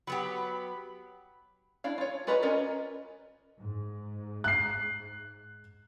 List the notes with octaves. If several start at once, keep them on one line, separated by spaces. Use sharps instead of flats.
F#3 B3 G4 B5
D4 E4 F5
F4 C#5
F4 F#4 B4 D#5 A#5
C#4 F4 A#4 D5 D#5
G#2
F#6 C7